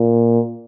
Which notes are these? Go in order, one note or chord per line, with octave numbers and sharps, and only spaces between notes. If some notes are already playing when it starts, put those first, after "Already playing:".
Already playing: A#2